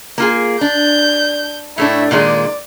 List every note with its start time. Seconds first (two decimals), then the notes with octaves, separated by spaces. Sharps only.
0.18 A#3 F4 G#4
0.61 D4 G6
1.78 A2 A3 D4 E4
2.11 A#2 D#3 G#3 D5